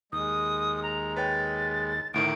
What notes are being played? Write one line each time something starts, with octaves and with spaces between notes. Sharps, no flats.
D#2 G#3 D#6
A#5
B4 C#5 G5 A6
D2 A2 D#3 D7